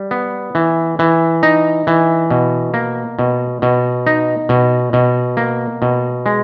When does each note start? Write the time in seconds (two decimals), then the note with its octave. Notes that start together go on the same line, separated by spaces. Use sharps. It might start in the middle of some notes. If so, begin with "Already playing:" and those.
Already playing: G3
0.11 B3
0.55 E3
0.99 E3
1.43 D#4
1.87 E3
2.31 B2
2.74 A#3
3.19 B2
3.62 B2
4.07 D#4
4.49 B2
4.93 B2
5.37 A#3
5.82 B2
6.26 G#3